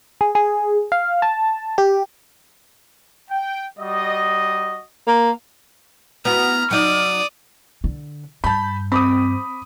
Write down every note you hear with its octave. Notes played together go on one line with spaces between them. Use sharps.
G#4
G#4
F5
A5
G4
G5
G3 F#4 D#5
A#3
B3 E4 F#4 A#5 F6
F#3 D#4 D5 D#6
D3
G2 A5 B5 G6
C4 B5 D6 D#6